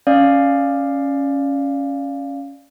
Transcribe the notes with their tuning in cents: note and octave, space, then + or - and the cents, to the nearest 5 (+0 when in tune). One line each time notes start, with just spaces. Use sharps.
C#4 +0 D5 +10 F5 +0